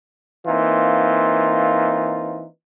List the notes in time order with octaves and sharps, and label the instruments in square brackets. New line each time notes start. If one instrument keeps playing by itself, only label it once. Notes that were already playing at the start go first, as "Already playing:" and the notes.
[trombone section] E3 A#3 C4 D#4 F4